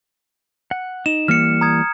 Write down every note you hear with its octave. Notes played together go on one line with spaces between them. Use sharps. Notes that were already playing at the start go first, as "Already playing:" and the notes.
F#5
D#4 E7
E3 G3 A#3 F6 C#7
A#5 D#6 G#6